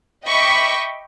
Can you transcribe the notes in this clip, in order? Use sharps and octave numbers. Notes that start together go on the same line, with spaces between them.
D#5 E5 G5 B5 C#6 D6